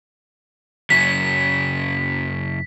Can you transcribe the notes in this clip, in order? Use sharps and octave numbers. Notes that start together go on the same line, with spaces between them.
F#2 C#3 F#3 B6